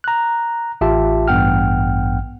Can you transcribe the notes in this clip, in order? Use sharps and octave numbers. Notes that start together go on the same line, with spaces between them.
A#5 F#6
A1 F4 G4 E5 A5
A1 G2 B3 F#5 G5 F6